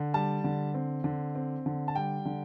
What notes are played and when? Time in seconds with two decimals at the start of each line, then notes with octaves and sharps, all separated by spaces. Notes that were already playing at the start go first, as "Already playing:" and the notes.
Already playing: D3
0.14 G3 A5
0.44 D3
0.74 C4
1.04 D3
1.35 C4
1.66 D3
1.88 A5
1.95 G3 G5
2.25 D3